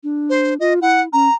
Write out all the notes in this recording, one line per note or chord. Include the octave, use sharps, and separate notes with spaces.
D4
C5
F4 D#5
E4 F#5
C#4 A#5